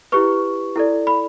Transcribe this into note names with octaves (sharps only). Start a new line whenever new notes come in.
E4 G4 B4 C#6
E4 A4 D5
B5